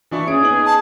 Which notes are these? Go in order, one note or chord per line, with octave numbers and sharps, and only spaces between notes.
E3 D4 E4 C#6
C#4 G#4 D7
B3 D#4 F#7
A5